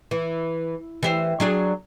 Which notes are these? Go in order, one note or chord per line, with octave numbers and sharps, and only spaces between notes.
E3
E3 G4 C5
F#3 D4 G#4